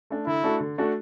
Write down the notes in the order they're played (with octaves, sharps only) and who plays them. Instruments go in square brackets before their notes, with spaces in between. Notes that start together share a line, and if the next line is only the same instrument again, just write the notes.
[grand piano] A3 D4
[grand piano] D3 [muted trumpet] E4
[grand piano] A3 D4 F#4 A4
D3
A3 D4 F#4 A4